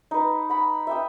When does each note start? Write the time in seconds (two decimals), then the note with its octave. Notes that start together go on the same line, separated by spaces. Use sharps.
0.11 D#4 B4
0.50 F#5 B5
0.87 E5 G5 D#6